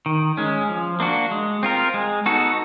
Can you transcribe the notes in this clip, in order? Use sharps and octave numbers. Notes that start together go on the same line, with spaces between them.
D#3
G#3 C#4
F3
A#3 D4 F#4
G#3
C4 F4 A#4
G#3
B3 D#4 F#4 A4